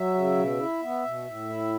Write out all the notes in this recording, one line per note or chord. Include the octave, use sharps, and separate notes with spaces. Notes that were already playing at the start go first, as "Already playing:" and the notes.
Already playing: F#3 E5
C#3
B2
E4
B3
B2
A2
E4